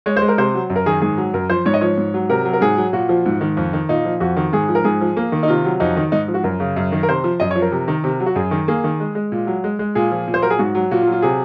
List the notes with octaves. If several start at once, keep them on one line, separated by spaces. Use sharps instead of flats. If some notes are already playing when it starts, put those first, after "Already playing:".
G#3 C#5
C5
G#3
A#4
C3 C5
F#3
F#2
A#4
D#3 G#4
G#2 G#4
F#3
F#2 A#4
F3 C5
G#2 C#5
D#5
F3 C#5
G#2
F#3
C3 A#4
F#3
A#4
G#2 G#4
F#3
A#2 F#4
F3
G#2
D#3
F2
D#3
A#2 D#4
F3
F2 F#4
D#3
G#2 G#4
F3
A#4
G#2 G#4
F3
A#3
D#3
D#4
C3 F4
F#3
F2 D#4
D#3
G#2 D#4
F3
F#4
F#2 A#4
C#3
F#2
D#3
A#4
C3 C5
F3
F#2 D#5
C#5
F3
A#4
C3
D#3
C3
F#3
F#4
F#2 G#4
D#3
A#3 G#4
D#3
G#3
G#3
A#2
F#3
G#3
G#3
A#2 G#4
F3
A#2
C5
F#3 A#4
G#4
G#2 F#4
F#3
A#2 F#4
F4
F#3
F4
C3 G#4